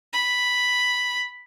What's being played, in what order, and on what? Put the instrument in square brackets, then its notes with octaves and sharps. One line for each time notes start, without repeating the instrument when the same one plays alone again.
[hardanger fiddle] B5